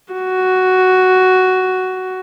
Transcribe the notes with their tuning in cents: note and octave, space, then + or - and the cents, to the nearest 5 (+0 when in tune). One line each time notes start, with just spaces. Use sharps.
F#4 +5